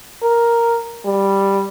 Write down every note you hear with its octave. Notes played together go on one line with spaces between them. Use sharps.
A#4
G3